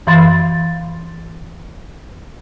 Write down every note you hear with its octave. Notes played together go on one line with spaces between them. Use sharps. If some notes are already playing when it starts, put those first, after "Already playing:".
F#2 E3 F5 B5 C6 A6